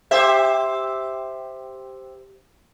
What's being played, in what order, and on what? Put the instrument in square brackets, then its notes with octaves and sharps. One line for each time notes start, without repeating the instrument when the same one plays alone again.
[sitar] G4 C5 E5